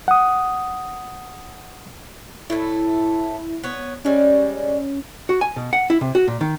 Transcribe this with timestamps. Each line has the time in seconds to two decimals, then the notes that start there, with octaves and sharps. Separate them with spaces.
0.08 F#5 D#6
2.50 A2 A3 E4
3.64 B3 C#5
4.05 G3 G#3 C#4
5.29 F#4
5.41 G#5
5.56 B2
5.73 F#5
5.90 E4
6.01 C3
6.15 F#4
6.28 A#2
6.41 D#3